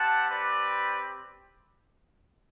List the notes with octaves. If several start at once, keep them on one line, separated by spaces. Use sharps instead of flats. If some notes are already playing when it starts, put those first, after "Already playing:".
Already playing: C4 G4 F#5 A5
B4 D5